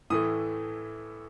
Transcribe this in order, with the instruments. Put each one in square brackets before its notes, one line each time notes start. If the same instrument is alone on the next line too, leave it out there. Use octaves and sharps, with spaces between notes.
[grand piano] A2 E3 A3 D#6